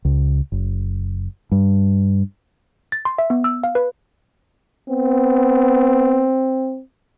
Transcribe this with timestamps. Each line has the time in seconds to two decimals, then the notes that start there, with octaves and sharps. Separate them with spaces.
0.05 C#2
0.52 F#1
1.52 G2
2.92 A6
3.05 C6
3.18 E5
3.30 B3
3.44 E6
3.64 F5
3.75 B4
4.89 B3 C4